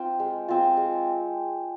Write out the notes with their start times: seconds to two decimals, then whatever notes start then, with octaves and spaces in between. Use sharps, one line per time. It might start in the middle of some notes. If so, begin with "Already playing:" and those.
Already playing: C4 F4
0.20 G#3
0.48 C4 F4
0.77 G#3